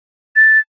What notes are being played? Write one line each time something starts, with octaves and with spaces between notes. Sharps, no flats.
A6